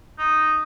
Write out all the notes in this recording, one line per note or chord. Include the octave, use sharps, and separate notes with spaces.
D#4